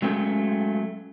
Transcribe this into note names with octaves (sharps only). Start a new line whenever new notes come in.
F#3 G#3 A3 C#4 G5